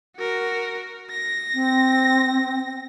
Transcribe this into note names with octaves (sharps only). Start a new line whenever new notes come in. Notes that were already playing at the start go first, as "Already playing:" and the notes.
F#4 A#4
A#6
C4